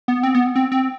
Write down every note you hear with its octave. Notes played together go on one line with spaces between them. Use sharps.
B3
C4
B3
C4
C4